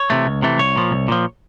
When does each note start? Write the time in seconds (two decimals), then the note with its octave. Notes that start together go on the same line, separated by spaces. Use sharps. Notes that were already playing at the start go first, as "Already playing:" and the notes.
Already playing: C#5
0.10 C3 E3 A3
0.26 C#2
0.42 C3 E3 A3
0.58 C2 C#5
0.76 A#2 F3
0.91 C2
1.08 A#2 F3